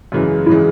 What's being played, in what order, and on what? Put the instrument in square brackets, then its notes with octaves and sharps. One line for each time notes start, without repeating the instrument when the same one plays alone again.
[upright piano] F#2 C#3 E3 G#3
[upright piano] C#3 E3 G#3 [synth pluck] E4